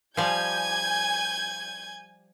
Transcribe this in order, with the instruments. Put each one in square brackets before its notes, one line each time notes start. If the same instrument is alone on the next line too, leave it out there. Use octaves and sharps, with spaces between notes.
[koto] F3 G3 [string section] G#5 G6 [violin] G#6